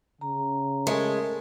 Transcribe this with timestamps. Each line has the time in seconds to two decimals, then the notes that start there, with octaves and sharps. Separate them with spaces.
0.21 C#3 A#5
0.87 G#3 A3 G#4 A#4